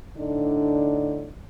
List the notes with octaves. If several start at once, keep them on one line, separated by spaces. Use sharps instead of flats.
A2 D3 D4 D#4